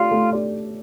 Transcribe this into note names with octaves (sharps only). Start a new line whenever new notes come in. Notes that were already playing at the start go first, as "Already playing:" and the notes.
Already playing: A3 D4 F4 G4 D5
A3
D4 G4 D5